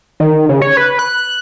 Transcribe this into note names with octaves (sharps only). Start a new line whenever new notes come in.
D#3
C#3
C#5
B4
F#6